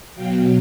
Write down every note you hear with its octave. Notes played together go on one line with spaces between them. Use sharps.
B2 F#3 F5 G5